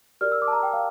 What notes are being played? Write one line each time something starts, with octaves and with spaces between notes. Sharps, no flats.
G4 A#4 D5 F6
E6
D6
A5
A#5
G5
F5